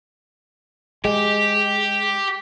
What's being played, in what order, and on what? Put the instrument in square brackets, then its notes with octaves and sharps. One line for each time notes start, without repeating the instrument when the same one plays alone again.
[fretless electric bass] G#3 [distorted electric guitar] G4